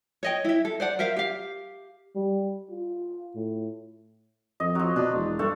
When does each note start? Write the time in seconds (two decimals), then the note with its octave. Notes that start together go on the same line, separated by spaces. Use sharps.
0.23 C#5 D#5 G5
0.45 E4 E5
0.65 A4
0.80 C5 D5 F#5
0.99 A#4 C5 E5 F5
1.16 G4 F5
2.16 G3
2.71 F4
3.35 A2
4.60 F2 D#5
4.75 F3 F#3
4.96 B2 D4
5.15 E1
5.39 G2 A3 A4